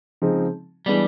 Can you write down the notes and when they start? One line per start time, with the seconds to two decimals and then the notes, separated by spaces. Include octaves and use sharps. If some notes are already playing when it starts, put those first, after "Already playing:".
0.22 C#3 F3 G#3 C4 D#4
0.86 E3 G3 G#3 B3 D4